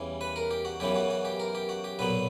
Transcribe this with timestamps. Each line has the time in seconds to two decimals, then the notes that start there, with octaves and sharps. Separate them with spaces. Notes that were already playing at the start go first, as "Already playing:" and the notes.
Already playing: E2 C#3 E3 G3
0.21 B4
0.36 A#4
0.51 G4
0.65 F#4
0.80 F#2 C#3 E3 B3 G4
0.95 F#4
1.10 F#4
1.25 G4
1.40 A#4
1.55 G4
1.69 F#4
1.84 G4
1.99 B1 A#2 F#3 B3 B4